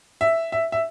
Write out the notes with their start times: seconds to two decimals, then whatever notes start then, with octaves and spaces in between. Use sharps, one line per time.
0.21 E5
0.52 E5
0.72 E5